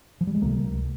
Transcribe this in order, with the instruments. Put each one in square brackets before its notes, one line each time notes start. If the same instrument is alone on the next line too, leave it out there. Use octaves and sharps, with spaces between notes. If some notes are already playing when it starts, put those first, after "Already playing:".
[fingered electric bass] F3
G3
G#3
C#2 C3 A#3